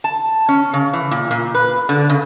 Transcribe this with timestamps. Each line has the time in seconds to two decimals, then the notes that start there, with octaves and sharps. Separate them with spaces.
0.04 A5
0.49 C#4
0.73 C#3
0.93 E3
1.11 A#2
1.31 A#2
1.54 B4
1.89 D3
2.10 C#3